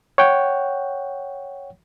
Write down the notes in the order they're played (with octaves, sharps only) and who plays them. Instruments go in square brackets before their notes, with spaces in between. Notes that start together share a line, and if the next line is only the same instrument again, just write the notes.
[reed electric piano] C#5 F#5 G5